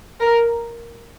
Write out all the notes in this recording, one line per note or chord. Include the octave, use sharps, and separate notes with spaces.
A#4